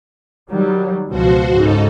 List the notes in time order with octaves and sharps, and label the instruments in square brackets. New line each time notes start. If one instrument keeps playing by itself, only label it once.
[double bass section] D#3 F#3 G3
[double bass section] C#2 B2 F3 [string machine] F#4 C5
[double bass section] G#2 C#3 [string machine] D#4 A4